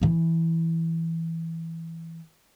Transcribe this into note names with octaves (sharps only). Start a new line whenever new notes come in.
E3 E4